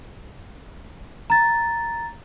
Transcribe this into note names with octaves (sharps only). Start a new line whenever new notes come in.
A#5 A6